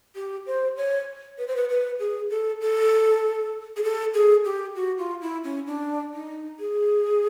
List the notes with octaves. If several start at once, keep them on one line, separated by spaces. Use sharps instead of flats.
G4
C5
C#5
B4
C5
B4
B4
G#4
A4
A4
G#4
A4
G#4
G4
F#4
F4
E4
C#4
D4
D#4
G#4